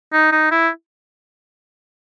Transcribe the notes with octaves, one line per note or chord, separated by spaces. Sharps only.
D#4
D#4
E4